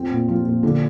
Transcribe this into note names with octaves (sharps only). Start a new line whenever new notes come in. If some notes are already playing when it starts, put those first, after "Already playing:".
Already playing: F2 F3 C4
A#2
F3 F4
A#2
D3 F3 D4